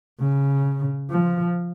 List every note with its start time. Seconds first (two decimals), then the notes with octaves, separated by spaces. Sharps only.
0.20 C#3
1.10 F3